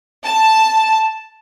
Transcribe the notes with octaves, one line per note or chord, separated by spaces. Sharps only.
A5